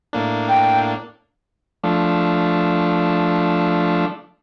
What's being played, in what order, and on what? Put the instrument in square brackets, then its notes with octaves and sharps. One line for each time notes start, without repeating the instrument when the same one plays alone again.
[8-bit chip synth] A2 A#3 D4
[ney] G5
[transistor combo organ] F3 A3 D4